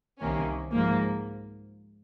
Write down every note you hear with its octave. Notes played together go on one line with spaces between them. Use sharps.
C2 C3 D#3 A#3 C#4
G#2 F3 A#3